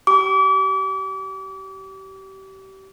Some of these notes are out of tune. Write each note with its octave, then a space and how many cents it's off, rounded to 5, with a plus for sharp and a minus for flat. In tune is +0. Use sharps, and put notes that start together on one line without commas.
G4 -30 D6 -35